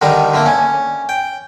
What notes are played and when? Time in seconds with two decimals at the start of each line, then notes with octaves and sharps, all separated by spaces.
0.02 D3 D#3 G3 D#4
0.34 D3 A3 A#3
0.46 C#4
1.09 G5